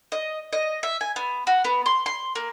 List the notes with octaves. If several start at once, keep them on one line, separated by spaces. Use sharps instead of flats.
D#5
D#5
E5
G#5
B3
F#4
B3
C6
C6
A#3